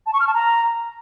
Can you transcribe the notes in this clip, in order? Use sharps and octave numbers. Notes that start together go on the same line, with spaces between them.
A5
C#6
F6
A5
A#5